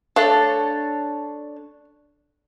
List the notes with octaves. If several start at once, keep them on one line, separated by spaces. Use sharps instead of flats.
A3 D4 A4 C#5 F5